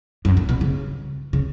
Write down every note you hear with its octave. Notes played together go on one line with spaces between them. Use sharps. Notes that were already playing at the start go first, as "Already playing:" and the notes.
F#2
A2
B2
C#3
C#3